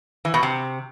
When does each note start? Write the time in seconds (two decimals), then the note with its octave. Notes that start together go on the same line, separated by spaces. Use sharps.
0.25 E3
0.34 B2
0.43 C3